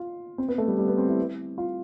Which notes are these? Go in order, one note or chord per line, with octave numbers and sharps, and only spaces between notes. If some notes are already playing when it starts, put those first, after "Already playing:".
Already playing: F4
C4
B3
A3
G3
G3
B3
C4
E4
F4